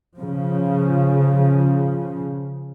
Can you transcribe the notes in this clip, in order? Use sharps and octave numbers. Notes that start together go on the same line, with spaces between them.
C#3 F3